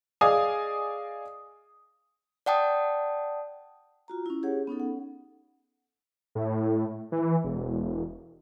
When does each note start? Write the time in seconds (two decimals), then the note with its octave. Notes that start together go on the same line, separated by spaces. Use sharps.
0.21 G#4 D5 D#5 F5 G#5 D#6
2.46 D5 F#5 G5 A5 D#6
4.08 F4 F#4 A#5
4.26 C#4 E4
4.43 G4 G#4 C#5 F#5
4.67 B3 C#4 D#4 A4
4.80 F#5
6.35 A2
7.12 E3
7.44 E1